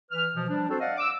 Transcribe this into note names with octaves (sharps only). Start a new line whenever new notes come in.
E3 B4 F6
B2 E3 F3
F3 G3 D4
C4 D4 F#4 A4 C5
D5 D#5 F5 F#5
D6 E6